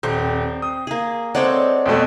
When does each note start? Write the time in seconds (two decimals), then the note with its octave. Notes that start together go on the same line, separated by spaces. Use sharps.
0.03 D#1 C4
0.62 D#6
0.87 A#3 G#4
1.35 G#3 C4 A4 C#5 D5 F#5
1.86 F2 B2 A3